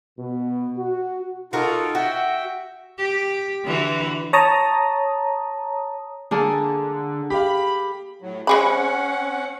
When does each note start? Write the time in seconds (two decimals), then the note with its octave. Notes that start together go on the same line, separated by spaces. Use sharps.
0.19 B2
0.78 F#4
1.53 D#4 F4 F#4 A4 A#4
1.95 F#4 E5 G5
2.98 G4
3.64 D3 E3 F#4
4.33 C#5 A5 A#5 D#6
6.31 D3 A#3 G#4 A4
7.30 G4 F5 B5
8.22 A2 F#3
8.47 G#3 C4 C#4 G#4 F#5 B5